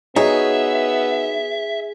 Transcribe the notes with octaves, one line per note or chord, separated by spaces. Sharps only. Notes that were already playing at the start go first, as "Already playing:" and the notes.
B3 D#4 F#4 G#4 C#5 E5